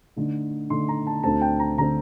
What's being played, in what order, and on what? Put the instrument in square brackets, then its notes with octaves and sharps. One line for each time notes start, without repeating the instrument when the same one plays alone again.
[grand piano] D3 A3 D#4
D3 A3 D#4 C6
A#5
A5
D2 D3 A3 C4 A5
G5
A#5
D3 A3 C4 A#5